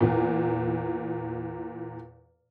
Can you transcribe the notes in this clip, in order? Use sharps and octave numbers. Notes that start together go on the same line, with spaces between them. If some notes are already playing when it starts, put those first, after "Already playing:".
E2 A#2